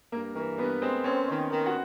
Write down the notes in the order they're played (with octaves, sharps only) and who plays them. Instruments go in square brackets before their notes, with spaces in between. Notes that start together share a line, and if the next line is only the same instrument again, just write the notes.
[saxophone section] G2 [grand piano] A#3 A#4
[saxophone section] E3 [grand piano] A#3 A#4
[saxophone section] G2 [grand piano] B3 B4
[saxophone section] G#3 [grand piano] C4 C5
[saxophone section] C4 [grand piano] C#4 C#5
[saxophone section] D#3
D#3
[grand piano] F#4 F#5